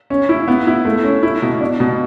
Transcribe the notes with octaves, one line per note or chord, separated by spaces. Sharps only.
C#4
E4
B3
E4
A3
C#4
E4
B2
D4
B2